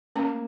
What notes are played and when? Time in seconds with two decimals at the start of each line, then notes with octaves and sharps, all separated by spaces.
0.15 A#3 C#4